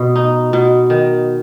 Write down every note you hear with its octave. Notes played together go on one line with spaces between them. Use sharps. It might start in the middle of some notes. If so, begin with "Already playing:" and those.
Already playing: B2
D#4
B2
D#3